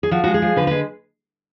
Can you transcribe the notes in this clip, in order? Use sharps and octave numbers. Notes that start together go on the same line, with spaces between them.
G#4
F3 F#4
G#3 F#4
G#4
F3
D3 B4
G#3 B4